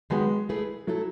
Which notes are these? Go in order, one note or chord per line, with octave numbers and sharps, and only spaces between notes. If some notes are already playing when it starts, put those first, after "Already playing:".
D#3 F#3 G#3 B3
A3 E4 G#4 B4
F#3 A3 E4 A4